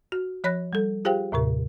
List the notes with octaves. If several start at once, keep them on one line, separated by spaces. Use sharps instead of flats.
F#4
F3 C#5 B5 F#6 A#6
G3 A4
F4 G4 G#4 C5 F5 G5
D#2 A2 C3 A#4